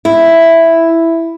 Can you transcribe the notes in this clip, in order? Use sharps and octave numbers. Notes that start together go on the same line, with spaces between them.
E4